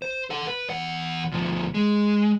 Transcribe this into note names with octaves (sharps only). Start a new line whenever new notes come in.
C5
A4 F#5
B4
E2 F#5
D2 F3
G#3